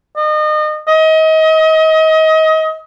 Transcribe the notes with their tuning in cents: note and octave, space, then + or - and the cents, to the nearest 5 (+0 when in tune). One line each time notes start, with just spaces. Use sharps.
D#5 -30
D#5 +30